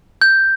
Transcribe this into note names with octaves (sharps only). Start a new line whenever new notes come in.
G6